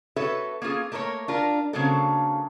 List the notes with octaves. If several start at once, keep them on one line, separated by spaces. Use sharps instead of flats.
F#4 A4 B4 C#5 E5
A#3 C#4 F4 G#4
A3 A#3 A#4 B4 C#5
D4 F4 A#4
C#3 F#3 A#3 C4 D4 A4